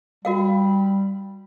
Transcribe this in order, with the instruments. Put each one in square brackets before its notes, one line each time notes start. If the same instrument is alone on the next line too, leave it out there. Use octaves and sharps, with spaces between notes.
[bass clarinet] G3 [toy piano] F#4 A#4 F5